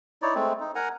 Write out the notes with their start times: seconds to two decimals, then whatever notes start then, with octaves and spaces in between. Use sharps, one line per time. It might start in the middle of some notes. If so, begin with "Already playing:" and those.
0.22 D#4 E4 C#5 D5
0.35 G#3 A3 C4
0.60 D#4
0.75 A#4 F#5 G#5 A#5